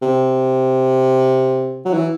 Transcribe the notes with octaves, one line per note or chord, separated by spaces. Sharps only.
C3
F#3
E3